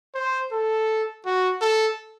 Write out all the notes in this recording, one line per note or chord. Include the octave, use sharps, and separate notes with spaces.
C5
A4
F#4
A4